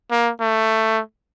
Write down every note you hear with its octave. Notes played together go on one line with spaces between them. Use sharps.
A#3
A3